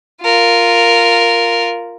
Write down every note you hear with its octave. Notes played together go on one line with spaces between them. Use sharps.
F4 A#4